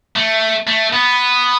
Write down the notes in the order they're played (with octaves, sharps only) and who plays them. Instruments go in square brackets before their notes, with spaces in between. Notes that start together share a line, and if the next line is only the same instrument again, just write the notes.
[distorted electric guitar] A3
A3
B3